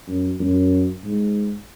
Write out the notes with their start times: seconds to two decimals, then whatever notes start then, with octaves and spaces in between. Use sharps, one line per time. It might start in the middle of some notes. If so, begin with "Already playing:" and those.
0.08 F#2
0.40 F#2
1.04 G#2